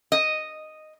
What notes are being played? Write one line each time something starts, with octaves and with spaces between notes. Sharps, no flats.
D#5